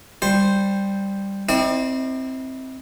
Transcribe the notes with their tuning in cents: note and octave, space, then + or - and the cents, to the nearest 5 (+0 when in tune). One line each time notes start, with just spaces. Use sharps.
G3 +5 C5 +0
C4 +0 E4 -40 D5 +40